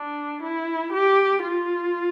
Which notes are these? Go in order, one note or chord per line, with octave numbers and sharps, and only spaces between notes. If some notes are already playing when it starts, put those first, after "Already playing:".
Already playing: D4
E4
G4
F4